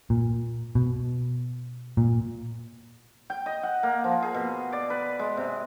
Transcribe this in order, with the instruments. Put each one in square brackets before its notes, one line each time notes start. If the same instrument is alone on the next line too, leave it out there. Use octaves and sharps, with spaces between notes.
[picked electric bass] A#2
B2
A#2
[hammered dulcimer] G5
D#5
F#5
A#3
F3
G#4
B2
D5
B4
G#3
C3